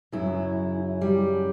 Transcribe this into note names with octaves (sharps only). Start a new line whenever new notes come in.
F#2 C#3 F#3 E4
G3